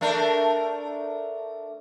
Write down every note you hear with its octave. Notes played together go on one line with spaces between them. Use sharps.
A3 D4 A#4